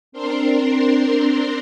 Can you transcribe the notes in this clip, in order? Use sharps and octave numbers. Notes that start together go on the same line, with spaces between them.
C4 D4 A#4 C6